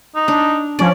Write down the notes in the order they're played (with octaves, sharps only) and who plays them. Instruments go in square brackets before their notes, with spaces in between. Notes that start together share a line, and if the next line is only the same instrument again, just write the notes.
[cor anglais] D#4
[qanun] D4
[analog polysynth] F3 C#4 [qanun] D5